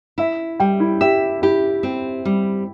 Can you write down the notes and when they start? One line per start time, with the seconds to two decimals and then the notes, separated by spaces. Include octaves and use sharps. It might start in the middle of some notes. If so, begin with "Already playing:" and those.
0.18 E4 E5
0.60 G3 G5
0.80 E4
1.01 G4 E5
1.42 E4 G4
1.83 C4
2.25 G3